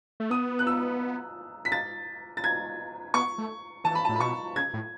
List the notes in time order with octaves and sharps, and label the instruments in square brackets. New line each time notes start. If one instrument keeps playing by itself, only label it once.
[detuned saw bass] A3
[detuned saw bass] B3 [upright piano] D#6
[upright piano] F#6
E6
B6
A6
A6
G#6
[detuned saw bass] B3 [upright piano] C#6
[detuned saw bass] A3
[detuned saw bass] E3 [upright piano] A5
[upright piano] B5
A5
[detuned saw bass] A2
[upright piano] B5
[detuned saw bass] B2 [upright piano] C#6
[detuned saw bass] C#3 [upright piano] G#6
[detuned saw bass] A2